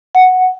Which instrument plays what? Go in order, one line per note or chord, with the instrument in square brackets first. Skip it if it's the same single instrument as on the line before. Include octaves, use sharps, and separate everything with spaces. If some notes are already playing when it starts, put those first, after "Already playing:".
[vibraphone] F#5